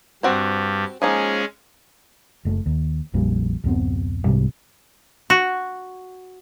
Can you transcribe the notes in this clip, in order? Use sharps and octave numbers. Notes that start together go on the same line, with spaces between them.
G2 G3 C4 F#4 C5
F3 G#3 A#3 C#4 D#4 G#4
F#1 A3
D#2
A#1 F2 A#2 G3
D1 F#2 B3 C4
C2 G#2 C3 G3
F#4